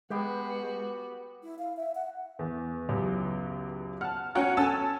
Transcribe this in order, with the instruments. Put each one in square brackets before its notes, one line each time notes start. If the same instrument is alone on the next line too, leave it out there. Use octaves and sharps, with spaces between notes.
[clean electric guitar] G#3 [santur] B3 G4 G5 [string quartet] F#4 B4
[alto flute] E4
F5
E5
F#5
[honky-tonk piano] E2
[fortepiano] C#2 F#2 G4
[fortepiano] F#5 A5 [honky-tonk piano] F6
[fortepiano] C#4 G5 A#5 [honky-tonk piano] F#4 C#5 F#5
[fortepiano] C#4 A4 G#5 [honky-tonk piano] A5 E6